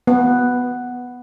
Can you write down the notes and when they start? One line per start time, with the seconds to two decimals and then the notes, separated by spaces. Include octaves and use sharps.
0.07 B3